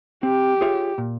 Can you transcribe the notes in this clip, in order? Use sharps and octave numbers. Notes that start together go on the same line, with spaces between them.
C4 G4
F4 G#4 C#5 E5
A#2